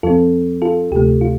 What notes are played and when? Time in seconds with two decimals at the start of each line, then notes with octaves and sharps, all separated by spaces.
0.03 F2 F3 C4 F4 A4
0.62 F4 A4
0.92 D2 C3 A3 G4
1.21 F4